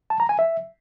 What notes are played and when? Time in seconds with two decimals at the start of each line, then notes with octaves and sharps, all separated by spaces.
0.10 A5
0.20 A#5
0.29 G#5
0.39 E5